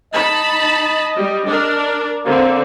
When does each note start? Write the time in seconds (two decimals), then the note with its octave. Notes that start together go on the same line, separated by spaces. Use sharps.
0.14 D#4 D#5 A5 B5
1.17 G3
1.47 D4 A#4
2.26 D3 A#3 C4